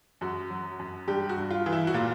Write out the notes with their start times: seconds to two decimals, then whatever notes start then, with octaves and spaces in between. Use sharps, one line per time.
0.21 F#2 F#4
0.50 F#3
0.79 F#2
1.08 G2 G4
1.29 F#4
1.37 G2
1.51 F4
1.66 E3
1.73 E4
1.87 F#4
1.94 A#2 F4